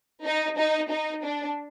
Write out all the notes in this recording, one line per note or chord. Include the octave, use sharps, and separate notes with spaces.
D#4
D#4
D#4
D4